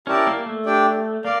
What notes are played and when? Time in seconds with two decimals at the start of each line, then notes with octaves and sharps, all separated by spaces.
0.07 C#4 E4 G4 A#4 D5 A5
0.27 A#3
0.46 A3
0.66 D4 G4 D5 G5
1.25 A#3 D5 F5